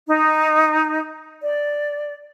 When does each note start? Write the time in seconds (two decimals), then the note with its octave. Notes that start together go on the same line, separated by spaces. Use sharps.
0.07 D#4
1.42 D5